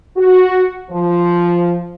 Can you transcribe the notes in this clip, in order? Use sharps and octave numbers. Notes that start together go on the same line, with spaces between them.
F#4
F3